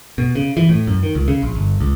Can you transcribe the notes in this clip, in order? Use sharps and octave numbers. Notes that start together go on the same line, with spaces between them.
B2
C#3
E3
A2
F#2
D#3
C#2
C#3
A#1
G1
C#2